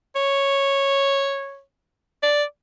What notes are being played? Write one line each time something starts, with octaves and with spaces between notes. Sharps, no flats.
C#5
D5